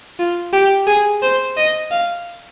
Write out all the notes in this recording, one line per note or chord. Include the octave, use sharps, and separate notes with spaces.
F4
G4
G#4
C5
D#5
F5